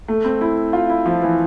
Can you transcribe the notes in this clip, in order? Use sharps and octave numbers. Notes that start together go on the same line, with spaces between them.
A3
C4
E4
F4
E4
F3
E3